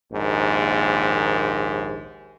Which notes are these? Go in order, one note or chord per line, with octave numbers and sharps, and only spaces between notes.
A#1 D#2 G#2